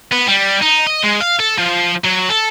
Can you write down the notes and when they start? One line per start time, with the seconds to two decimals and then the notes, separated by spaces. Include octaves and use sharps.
0.12 B3
0.28 G3
0.62 D#4
0.87 D#5
1.03 G#3
1.21 F5
1.39 A4
1.58 F3
2.04 F#3
2.29 A4